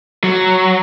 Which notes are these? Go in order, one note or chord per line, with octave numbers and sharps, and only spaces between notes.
F#3